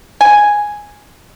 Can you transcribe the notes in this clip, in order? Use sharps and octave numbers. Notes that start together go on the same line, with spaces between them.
G#5